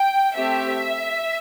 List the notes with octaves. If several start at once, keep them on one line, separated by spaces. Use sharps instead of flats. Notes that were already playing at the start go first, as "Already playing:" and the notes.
Already playing: G5
A3 C4 G4 E5